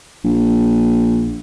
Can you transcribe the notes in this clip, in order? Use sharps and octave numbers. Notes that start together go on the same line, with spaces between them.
A#1